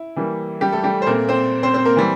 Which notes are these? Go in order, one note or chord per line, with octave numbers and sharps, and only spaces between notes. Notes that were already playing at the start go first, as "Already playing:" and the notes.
Already playing: E4
E3 G3 A#3
G3 G4
A3 A4
G3 G4
C5
A#2 A3 A#3 C4 A#4
C4 C5
C4 C5
C4 C5
A#3 A#4
E3 G3 C4